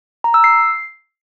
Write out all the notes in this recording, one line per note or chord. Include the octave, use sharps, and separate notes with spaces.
A#5
E6
C7